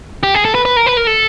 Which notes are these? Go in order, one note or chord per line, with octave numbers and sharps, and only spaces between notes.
G4
G#4
A4
B4
B4
A#4
B4
A#4
A4